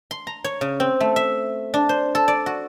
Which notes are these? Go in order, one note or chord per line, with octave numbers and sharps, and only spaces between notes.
C6
A#5
C#5
C#3
C4
A3
E5
D4
C5
A4
D5
F#4